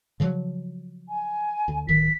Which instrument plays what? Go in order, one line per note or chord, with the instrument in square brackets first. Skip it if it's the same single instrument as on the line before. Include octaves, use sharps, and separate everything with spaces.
[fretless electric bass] C#3 F3 F#3
[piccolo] G#5
[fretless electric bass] D2
[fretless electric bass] D1 D#3 [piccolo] B6